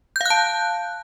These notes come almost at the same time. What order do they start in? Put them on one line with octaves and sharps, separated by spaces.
G6 F5 F#6 A5